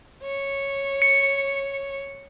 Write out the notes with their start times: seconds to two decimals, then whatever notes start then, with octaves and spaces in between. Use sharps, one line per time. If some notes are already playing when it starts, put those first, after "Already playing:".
0.23 C#5 C#6
1.02 C#7